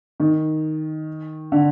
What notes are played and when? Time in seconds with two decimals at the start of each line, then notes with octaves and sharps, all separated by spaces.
0.20 D#3
1.52 D3